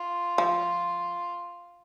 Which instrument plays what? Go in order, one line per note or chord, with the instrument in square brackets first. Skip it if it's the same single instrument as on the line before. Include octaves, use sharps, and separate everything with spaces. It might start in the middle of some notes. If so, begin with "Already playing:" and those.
Already playing: [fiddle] F4
[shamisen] F3